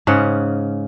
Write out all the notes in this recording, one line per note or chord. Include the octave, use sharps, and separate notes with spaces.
G#2 C#3 C#4 F#5